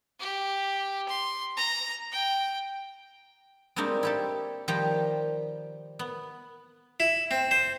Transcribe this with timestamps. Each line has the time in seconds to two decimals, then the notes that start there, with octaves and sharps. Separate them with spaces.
0.20 G4
1.08 C6
1.57 A#5
2.12 G5
3.76 G3 G#3 A#3 C4 D4 D#4
4.03 E4 G4 A4
4.68 D#3 F3 G3 G4 G5 A#5
5.99 B3
7.00 E4
7.31 C4
7.51 C5